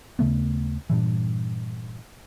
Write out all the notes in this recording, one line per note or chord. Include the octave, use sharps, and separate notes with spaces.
D#2 C#3 A3 B3
G2 A#2 E3